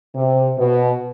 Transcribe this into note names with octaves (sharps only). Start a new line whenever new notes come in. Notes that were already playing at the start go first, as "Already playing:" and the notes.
C3
B2